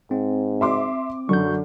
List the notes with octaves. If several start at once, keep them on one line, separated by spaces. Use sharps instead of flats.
G#2 C4
E5 C6 D6
F#2 D3 C#6 G6